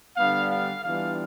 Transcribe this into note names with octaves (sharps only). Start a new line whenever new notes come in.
D3 G3 B3 D4 F5
F5
E3 G3 B3 D4 F4 F5